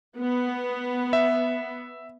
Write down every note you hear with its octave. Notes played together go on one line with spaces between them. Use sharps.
B3
E5